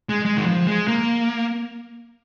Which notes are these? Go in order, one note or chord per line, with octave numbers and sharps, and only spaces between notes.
G#3
G#3
D#3
F3
G#3
A#3